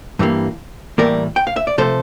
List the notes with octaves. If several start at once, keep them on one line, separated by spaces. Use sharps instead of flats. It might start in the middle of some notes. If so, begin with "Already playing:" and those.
G2 E3 G3 A#3
A2 E3 G3 A#3 A#4 D5
G5
F5
E5
D5
C3 F3 A3 A4 C5